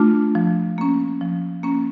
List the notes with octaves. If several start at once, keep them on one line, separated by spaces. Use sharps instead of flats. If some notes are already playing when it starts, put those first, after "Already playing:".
Already playing: A3 D4 F4
F3
A#3 C#4
F3
A#3 C#4